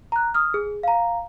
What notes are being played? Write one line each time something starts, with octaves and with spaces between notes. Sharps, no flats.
A#5 F#6
D#6 F6
G#4
F5 A#5